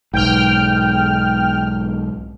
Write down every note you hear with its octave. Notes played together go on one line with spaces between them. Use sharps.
B1 G#2 G5 F6